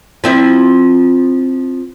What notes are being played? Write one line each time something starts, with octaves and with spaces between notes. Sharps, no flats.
F3 C4 E4